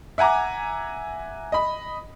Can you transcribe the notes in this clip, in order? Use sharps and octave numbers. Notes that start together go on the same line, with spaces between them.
E5 F#5 G#5 A#5 D6
D#5 B5